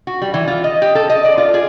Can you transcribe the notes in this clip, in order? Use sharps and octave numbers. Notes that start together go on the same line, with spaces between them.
F#4
G3
E3
F4
D#5
G4
A4
D#5
D5
F4
G#4